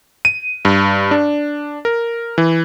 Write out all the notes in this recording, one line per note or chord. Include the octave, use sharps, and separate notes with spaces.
D#7
G2
D4
A#4
E3